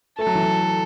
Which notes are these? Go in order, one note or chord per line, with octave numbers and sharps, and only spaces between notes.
A3 A4
F#3
E3
F#3